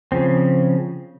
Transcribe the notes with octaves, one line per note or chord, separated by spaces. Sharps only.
C#3 F3 C4